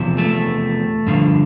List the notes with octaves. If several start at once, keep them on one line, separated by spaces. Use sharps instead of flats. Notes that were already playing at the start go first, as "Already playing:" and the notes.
Already playing: E2 C3 F3
A3
G2 D3 F3